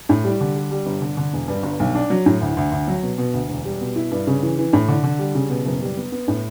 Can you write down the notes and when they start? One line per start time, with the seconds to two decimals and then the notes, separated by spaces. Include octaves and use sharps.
0.09 A2
0.24 G3
0.41 D3
0.56 G3
0.71 G3
0.86 G1
1.02 D3
1.17 D3
1.33 E1
1.48 G2
1.63 G1
1.80 B1
1.95 D4
2.10 F#3
2.26 A2
2.41 D2
2.57 D2
2.72 D2
2.88 F#3
3.03 B2
3.18 B2
3.34 D2
3.49 E1
3.65 G3
3.81 B2
3.96 E4
4.11 G2
4.27 C#3
4.43 E3
4.58 E3
4.73 A2
4.88 D3
5.04 D3
5.19 G3
5.35 C#3
5.50 B2
5.65 F#1
5.82 G3
5.97 B3
6.12 B3
6.28 A2